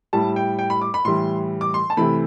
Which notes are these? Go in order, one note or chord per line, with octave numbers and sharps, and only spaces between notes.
A2 G3 A5
G5
G5
B5
D6
B5
A2 E3 G3 C6
D6
C6
A5
C3 E3 A3 B5